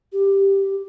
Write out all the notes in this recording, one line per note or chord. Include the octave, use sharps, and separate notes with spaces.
G4